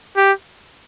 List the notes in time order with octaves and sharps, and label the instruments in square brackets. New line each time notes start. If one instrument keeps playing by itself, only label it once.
[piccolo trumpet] G4